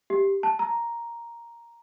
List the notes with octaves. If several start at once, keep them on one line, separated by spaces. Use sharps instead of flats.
G4
A5
A#5